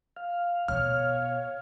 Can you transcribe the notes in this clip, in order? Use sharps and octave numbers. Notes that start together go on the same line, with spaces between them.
F5
B2 C#5 F6